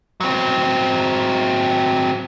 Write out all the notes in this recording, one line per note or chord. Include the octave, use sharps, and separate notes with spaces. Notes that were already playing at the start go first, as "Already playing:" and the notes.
F#3 C4